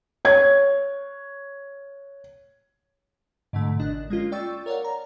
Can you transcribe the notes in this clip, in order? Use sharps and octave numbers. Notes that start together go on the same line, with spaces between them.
C#5 G#6
G#2 B2 D3 A3
G#1 D4 D#5 F#6
G#3 A#3 C#4 F4
D5 G5 C#6 E6 A6
A#4 C#5 D5 F5 F#5
A#5